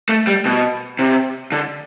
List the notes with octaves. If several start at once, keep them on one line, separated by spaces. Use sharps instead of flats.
A3
G3
B2
C3
D3